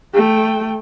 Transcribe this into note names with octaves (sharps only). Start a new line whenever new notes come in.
A3 G5